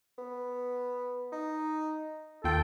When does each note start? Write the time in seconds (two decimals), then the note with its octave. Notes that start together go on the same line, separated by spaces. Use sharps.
0.18 B3
1.32 D#4
2.44 D#2 F4 A4 G5